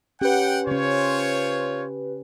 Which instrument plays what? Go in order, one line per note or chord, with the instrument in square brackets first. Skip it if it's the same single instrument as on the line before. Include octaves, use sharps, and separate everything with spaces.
[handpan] C#4 [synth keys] G4 B4 [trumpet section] F#5 G5
[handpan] C#3 C#4 [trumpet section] F4 C5 C#5